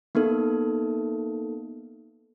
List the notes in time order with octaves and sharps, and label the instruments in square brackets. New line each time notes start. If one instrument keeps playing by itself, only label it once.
[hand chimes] A#3 B3 D#4 A4